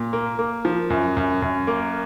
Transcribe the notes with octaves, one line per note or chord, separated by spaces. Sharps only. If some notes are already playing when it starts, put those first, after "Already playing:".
Already playing: A#2
A#3
A#3
F3
F#2
F#2
F#2
A#3